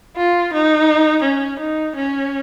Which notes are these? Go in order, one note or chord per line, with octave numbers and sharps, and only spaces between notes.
F4
D#4
C#4
D#4
C#4